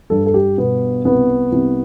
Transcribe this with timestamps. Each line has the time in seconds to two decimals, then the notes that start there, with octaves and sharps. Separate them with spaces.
0.10 G2 A4
0.26 A4
0.34 G4
0.58 B2 B3
1.05 C2 B3
1.52 C2